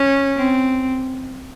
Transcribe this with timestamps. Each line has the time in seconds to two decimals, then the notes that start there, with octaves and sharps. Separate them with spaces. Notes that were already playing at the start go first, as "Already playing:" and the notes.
Already playing: C#4
0.36 C4